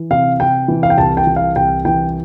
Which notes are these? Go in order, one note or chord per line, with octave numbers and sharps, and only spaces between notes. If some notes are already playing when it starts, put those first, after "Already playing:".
Already playing: E3
C3 F5
C3 G5
E3
F5
G5
C2 A5
G5
E3
F5
C2 G5
E3 G5